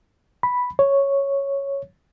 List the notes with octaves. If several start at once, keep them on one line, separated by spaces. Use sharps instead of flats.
B5
C#5